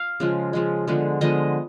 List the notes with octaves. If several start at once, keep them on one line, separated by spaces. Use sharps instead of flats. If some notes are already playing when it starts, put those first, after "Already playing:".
Already playing: F5
C#3 F3 G#3
C#3 F3 G#3
D3 F3 G#3 B3
D3 F3 G#3 B3 D#5